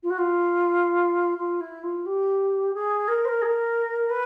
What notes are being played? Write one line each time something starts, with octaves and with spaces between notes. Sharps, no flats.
F4
F#4
F4
F4
E4
F4
G4
G#4
A#4
C5
A#4
G#4
A#4
B4